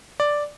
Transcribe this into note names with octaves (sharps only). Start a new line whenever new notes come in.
D5